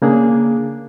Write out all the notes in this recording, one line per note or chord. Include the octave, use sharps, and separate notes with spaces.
C#3 A#3 D4 G#4